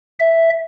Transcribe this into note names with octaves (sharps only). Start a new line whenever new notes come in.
E5